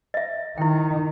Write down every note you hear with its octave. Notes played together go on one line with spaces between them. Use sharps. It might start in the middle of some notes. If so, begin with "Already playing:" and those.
D#5 E5
D#3 E4 G5